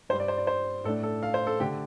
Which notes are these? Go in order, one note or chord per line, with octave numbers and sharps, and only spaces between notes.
G2 G3 D4 C5
D5
C5
D5
C5
A2 A3 D4 A4
A4
F5
C5
A4
D3 A3 D4 G4